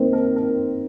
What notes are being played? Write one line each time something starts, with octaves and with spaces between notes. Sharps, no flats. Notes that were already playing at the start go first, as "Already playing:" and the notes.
Already playing: D#3 A#3 C4 D#4 A#4 C5
A#4
A#4